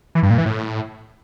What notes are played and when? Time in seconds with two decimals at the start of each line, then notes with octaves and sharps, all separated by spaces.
0.15 E3
0.23 G2
0.31 A#2
0.38 E3
0.46 A2